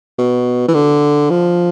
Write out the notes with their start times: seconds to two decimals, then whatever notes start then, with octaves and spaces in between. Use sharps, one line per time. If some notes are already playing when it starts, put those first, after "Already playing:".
0.18 B2
0.68 E3
0.74 D3
1.30 F3